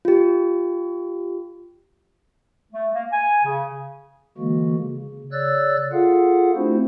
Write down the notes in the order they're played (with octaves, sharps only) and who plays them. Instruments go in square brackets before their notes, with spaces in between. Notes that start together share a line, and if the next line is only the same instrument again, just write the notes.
[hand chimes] F4 G4
[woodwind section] A3
A#3
G#5
C#3
[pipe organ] D3 E3 G#3 A#3 F#4
C#3
C#3 C#5 D5 E6 F#6 A6
F4 G#4 A4 F5 F#5
A3 C4 D4 E4 F#4 C5